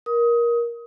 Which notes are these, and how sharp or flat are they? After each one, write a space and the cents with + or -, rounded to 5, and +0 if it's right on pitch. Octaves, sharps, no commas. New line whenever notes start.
A#4 +20 D#6 +20